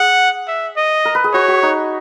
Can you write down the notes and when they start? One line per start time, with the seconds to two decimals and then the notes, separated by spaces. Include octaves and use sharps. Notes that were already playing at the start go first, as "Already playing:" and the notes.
Already playing: G#4 F#5
0.48 E5
0.76 D#5
1.05 A#4
1.15 B4
1.24 G#4
1.33 F#4 C#5
1.48 F#4
1.63 D#4